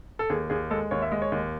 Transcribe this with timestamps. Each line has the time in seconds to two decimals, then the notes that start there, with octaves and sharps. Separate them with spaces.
0.19 A4
0.30 D#2 G#4
0.50 D#2 G#4
0.71 G#3 A4
0.91 D#2 C#5
1.02 E5
1.12 G#3 D#5
1.22 C#5
1.32 D#2